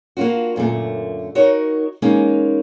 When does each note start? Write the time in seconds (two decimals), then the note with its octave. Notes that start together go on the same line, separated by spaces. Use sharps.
0.17 A#3 D4 D#4 F4 F#4
0.56 F#2 A#2 D3 A3
1.35 D#4 F#4 A#4 C#5
2.02 E3 G#3 A#3 C#4 D#4